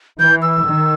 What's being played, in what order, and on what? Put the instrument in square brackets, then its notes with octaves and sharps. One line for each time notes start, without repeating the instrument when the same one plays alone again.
[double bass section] E3 [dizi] G6
[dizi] E6
[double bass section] D#3